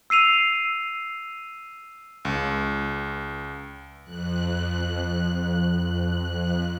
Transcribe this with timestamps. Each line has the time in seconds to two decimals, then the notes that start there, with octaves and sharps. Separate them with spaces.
0.10 E6 C7 D#7 F7
2.25 C#2
4.03 F2 F#6